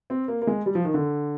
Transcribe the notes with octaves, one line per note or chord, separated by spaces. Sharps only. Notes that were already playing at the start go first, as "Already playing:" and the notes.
C4
A#3
A#3
G#3
G3
F3
D#3
D3